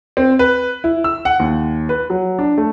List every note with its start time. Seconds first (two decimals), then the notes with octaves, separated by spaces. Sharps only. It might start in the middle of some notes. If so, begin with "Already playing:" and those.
0.17 C4
0.39 B4
0.84 E4
1.04 E6
1.25 F#5
1.40 D#2
1.89 B4
2.10 F#3
2.39 D4
2.58 A3